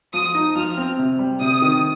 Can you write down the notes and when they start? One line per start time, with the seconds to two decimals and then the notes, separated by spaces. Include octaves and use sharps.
0.13 F3 D#6
0.35 D#4
0.56 F3 F6
0.77 C4
0.99 C3
1.19 G3
1.41 C3 D#6
1.62 D#3